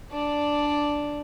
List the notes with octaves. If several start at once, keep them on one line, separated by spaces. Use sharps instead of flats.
D4 D5